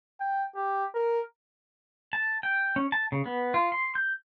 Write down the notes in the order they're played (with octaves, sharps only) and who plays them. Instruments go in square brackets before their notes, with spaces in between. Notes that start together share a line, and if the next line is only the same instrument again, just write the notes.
[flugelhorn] G5
G4
A#4
[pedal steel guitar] A5
G5
C#4
A5
C#3
B3
F4
C6
G6